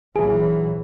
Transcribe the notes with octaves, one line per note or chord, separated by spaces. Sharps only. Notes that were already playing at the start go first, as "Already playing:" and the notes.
A#1 E3 F#3 G#4